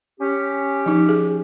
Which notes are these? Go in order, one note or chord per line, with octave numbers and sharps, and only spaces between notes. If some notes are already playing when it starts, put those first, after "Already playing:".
C#4 G4
F3 D#4
G#4